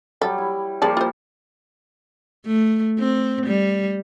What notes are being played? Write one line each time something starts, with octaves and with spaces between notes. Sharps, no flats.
F#3 G3 A4
E4
F3 G3 A#3 G#4 D5 A5
F4 C5
A3
C4
G3